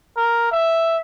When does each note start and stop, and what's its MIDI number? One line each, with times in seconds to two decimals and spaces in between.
0.17 0.50 70
0.52 0.98 76